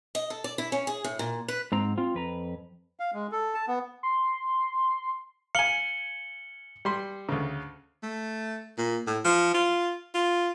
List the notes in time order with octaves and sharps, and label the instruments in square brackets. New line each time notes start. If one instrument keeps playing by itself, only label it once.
[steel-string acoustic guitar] D#5
A4
D5
E4
C#4
G#4
A2
A#2
B4
[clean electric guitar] G#2 C4 A#5
C4 F4
F2 B4 A#5
[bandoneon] F5
G#3
A4
A5
B3
[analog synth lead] C6
[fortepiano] F5 G#5 [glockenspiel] C#7 F#7 G7
[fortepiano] G3 C6
D2 C#3
[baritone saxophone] A3
A#2
A2
F3
F4
F4